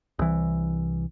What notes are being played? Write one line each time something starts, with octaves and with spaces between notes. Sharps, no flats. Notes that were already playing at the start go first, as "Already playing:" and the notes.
C2 E3